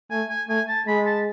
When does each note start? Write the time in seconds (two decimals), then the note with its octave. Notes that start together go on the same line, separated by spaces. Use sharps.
0.11 A3 G#5
0.30 G#5
0.49 A3 G#5
0.68 A5
0.87 G#3 B5
1.06 A5